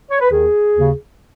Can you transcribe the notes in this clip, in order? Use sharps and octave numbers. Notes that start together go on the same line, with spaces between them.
C#5
B4
D#2 D#3 G#4
D#2 C#3